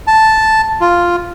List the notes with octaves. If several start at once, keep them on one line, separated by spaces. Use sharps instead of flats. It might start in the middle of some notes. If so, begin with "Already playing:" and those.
A5
F4